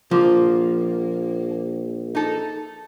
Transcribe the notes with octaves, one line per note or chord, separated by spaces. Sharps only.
A#1 F3 A#3
D#4 A4